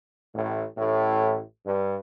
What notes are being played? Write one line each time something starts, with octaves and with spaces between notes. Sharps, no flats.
A1 A2
A1 A2
G2